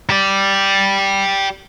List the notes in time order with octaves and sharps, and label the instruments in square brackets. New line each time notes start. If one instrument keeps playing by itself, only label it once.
[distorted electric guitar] G4 D5